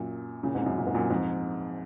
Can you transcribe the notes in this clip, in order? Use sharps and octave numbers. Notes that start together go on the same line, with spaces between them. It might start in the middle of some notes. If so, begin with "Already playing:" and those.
Already playing: F#2 A#2
A#2 C#3
G#2 C3
F#2
A#2
G#2
F#2 A#2
F2 G#2